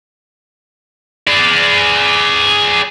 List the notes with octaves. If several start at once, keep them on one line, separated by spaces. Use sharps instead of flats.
G#4 D5